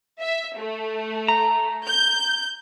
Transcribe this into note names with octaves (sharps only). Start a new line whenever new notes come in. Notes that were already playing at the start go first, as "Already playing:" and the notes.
E5
A3
A#5
G6